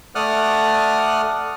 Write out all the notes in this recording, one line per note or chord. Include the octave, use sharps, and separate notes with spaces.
A3 D5 F#5 D#6 F6 F#6